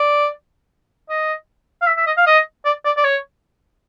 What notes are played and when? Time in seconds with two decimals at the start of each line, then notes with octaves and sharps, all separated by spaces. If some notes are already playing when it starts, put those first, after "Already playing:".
Already playing: D5
1.09 D#5
1.82 F5
1.87 E5
1.97 E5
2.06 D#5
2.17 F5
2.27 D#5
2.65 D5
2.85 D5
2.97 D5
3.04 C#5